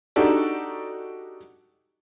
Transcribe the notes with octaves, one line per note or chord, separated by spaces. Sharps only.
D4 D#4 F#4 G4 A4 D5